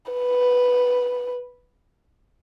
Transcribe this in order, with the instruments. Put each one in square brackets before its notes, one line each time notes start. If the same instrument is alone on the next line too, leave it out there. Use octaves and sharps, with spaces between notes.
[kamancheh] B4